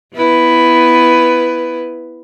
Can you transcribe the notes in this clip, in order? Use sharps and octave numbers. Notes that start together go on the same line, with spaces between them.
B3 E4 B4